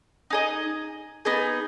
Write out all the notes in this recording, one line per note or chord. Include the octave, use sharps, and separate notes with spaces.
D#4 G#4 D#5
B3 D#4 G#4